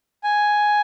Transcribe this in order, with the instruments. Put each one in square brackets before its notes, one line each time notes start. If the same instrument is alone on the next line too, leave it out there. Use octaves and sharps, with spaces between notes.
[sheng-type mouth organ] G#5